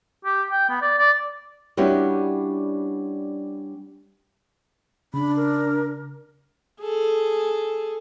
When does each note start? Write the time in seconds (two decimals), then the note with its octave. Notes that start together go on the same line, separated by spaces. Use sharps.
0.25 G4
0.51 G5
0.69 B3
0.82 D5
0.99 D5
1.77 G3 B3 C#4 D4 E4 F#4
5.14 C#3 D4 B5
5.36 A#4
6.81 G#4 A4